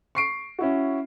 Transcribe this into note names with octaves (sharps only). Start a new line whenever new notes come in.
C#6 C7 D7
C#4 E4 F#4